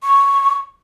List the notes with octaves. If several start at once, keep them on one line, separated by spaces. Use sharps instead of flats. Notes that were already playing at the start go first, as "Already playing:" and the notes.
C#6